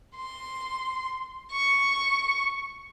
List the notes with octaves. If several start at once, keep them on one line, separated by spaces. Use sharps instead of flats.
C6
C#6